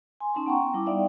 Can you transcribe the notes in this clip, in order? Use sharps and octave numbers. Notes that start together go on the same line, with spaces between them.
G#5 C6
C#4 D#4 A5 C6
B3 F#5 G5 A#5 C#6
G3 E4 D6
B3 D#4 D5 E5 F5 G5